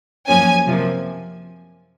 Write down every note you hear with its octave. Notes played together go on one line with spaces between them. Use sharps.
F#2 F3 A#3 C#4 G#5
C3 F3 A#3